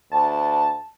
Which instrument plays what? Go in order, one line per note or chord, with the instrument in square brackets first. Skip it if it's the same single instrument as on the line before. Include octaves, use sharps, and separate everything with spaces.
[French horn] D2 [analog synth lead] A5